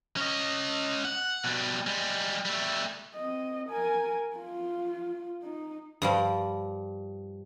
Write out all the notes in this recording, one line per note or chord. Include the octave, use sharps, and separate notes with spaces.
C#4 D#5
F#5
B2 G3
G3 G#3
G3 A3
C4 D#5
A#4 G#5
F4
D#4
G2 F3 G3